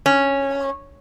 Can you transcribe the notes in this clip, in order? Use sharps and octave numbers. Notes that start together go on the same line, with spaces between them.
C#4